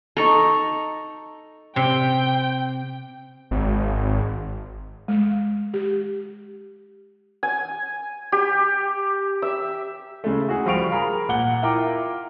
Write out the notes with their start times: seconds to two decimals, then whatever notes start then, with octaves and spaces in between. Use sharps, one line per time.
0.17 D#4 A4 A#5 C#6
1.76 C3 G5
3.51 G#1
5.08 G#3
5.74 G4
7.43 G#5
8.32 G4
9.42 E5
10.24 C#3 G#3 A3
10.49 F#4 G#4
10.66 F3 G3 F5 C#6 D7 F7
10.91 G#4 A#4 B5
11.29 A#2 F#5 G7
11.62 E4 F4 A#4 G5 D6